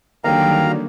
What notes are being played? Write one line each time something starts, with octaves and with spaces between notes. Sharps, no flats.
D3 D#3 F#3 G3 A#3 F5 G5 A#5